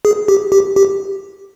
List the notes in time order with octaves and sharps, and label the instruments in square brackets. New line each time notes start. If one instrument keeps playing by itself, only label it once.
[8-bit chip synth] G#4
G4
G4
G4